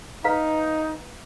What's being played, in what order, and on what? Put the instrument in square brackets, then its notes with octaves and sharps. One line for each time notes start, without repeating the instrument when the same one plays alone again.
[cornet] D#4 [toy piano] B4 F5 A#5